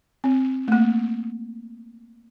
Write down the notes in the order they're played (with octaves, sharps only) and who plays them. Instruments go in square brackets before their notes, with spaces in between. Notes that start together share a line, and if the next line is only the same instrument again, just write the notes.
[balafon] C4
A3
A#3